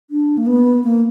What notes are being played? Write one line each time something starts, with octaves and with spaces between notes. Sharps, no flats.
D4
A#3
B3
A#3